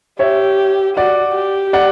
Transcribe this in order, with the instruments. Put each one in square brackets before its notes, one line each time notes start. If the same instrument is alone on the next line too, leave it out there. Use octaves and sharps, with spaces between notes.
[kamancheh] G4 [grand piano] C#5 E5
[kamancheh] F#4 [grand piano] D5 F#5
[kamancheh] G4
[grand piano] D5 F#5